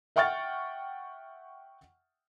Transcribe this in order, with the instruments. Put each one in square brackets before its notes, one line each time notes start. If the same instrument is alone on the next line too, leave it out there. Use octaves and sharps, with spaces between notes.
[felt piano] E5 F#5 G5 C#6 F6 A6